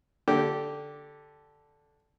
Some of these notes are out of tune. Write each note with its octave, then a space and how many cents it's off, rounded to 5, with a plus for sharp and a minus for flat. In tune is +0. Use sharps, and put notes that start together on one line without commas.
D3 -10 G4 -15